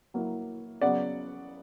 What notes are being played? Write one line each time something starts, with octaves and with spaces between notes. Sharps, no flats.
F#3 A#3 E4
C#3 F#3 B3 D5 F#5